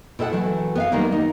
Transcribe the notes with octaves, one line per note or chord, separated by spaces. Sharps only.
B2 E4 A4 D#5 F#5
E3 F#3 A3
B3 E5 F5
D#3 F#3 G3 A#3 A#4
D#4